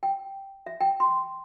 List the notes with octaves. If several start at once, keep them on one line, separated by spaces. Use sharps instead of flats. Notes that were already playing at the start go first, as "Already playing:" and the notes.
G5
E5
G5
C6